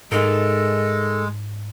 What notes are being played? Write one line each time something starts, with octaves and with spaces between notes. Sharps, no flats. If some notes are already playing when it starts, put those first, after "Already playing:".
G#2 G#3 A3 D#4 A4 A#4